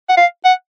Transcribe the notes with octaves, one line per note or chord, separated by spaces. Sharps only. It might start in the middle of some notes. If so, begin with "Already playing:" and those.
F#5
F5
F#5